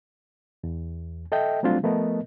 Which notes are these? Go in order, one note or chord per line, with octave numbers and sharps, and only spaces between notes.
E2
A4 D#5 E5 G5
F#3 G3 A3 C4 D4 F4
F3 A3 B3 A#4 D#5